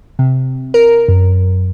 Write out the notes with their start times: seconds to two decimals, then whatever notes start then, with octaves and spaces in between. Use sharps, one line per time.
0.19 C3
0.74 A#4
1.08 F#2